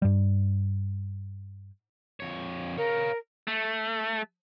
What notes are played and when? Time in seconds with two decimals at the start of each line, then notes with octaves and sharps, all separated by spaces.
0.02 G2 G3
2.20 F2 C#5
2.78 A#4 C#5 F5
3.48 A3